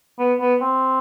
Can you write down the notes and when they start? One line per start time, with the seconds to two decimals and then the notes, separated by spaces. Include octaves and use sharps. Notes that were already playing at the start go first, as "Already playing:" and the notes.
0.19 B3
0.41 B3
0.62 C4